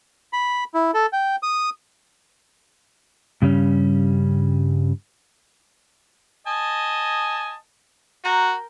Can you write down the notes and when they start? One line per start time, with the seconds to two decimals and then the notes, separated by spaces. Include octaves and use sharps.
0.33 B5
0.74 E4
0.94 A4
1.13 G5
1.43 D#6
3.42 G2 C#3 G3 C#4
6.47 D#5 G#5 A5
8.25 F#4 A#4 G5 A#5